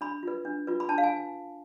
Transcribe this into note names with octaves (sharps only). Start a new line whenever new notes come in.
D4 B5
F4 B4
D4
F4 B4
B5
D4 A5
F5
G#5